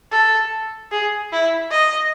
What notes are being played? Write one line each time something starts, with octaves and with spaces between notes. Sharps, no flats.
A4
G#4
E4
D#5